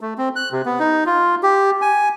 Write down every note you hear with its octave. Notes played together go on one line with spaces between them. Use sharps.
A3
C4
F#6
C3
B3
D#4
F4
G4
G#5